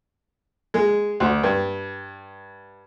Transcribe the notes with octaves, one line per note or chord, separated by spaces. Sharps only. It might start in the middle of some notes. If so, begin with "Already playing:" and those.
G#3
D2
G2